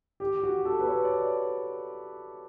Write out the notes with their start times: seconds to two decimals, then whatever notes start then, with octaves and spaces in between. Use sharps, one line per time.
0.20 G4
0.43 F#4
0.65 A4
0.79 B4
0.87 C#5
1.05 D5